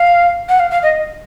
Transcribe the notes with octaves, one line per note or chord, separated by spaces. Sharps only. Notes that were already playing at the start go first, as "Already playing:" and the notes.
Already playing: F5
F#5
F5
F5
D#5